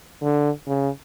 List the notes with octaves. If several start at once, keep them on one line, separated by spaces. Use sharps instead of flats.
D3
C#3